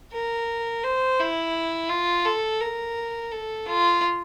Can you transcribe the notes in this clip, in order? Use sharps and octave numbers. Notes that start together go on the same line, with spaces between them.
A#4
C5
E4
F4
A4
A#4
A4
F4